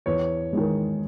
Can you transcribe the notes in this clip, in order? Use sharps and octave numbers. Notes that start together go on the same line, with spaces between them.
E2 C#5
D#3 G#3